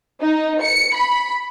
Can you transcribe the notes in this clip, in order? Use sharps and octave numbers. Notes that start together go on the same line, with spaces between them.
D#4
C#7
B5